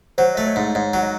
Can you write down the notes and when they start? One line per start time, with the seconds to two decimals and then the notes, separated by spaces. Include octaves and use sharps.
0.18 F#3 C5
0.35 A3 D#5
0.47 C#5
0.56 G#2
0.75 G#2 C#5
0.94 F#3
1.03 D#5